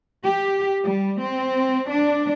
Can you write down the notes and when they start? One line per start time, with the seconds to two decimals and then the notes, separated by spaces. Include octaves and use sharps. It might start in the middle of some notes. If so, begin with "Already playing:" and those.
0.23 G4
0.85 G3
1.22 C4
1.90 D4